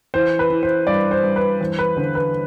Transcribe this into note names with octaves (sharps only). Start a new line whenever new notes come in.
E3 C5
B4
E3
C5
G2 D5
C5
G2
B4
E2 C5
B4
D3 C5
B4